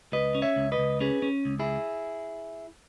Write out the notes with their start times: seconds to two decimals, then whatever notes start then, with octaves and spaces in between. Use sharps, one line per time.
0.12 C#2 B4 D#5
0.35 C#4
0.42 C#5 E5
0.56 C#2
0.72 B4 D#5
0.78 C#2
1.01 C#4 G#4 B4
1.22 C#4
1.45 C#2
1.59 E4 G#4